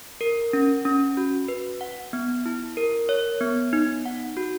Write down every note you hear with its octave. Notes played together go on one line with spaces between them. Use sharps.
A#4
C#4
C#4
F#4
B4
F#5
B3
E4
A#4
C#5
B3
D#4
F#5
F#4